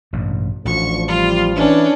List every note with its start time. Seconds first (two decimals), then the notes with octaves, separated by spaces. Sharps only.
0.13 A1 G2 B2
0.65 A1 D2 F3 C#6
1.09 F3 G3 F4
1.55 E3 C#4 D4